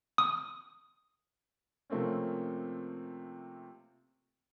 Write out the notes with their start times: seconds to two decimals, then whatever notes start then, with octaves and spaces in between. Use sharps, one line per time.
0.18 D#6
1.90 C3 F3 A3 A#3 C4 C#4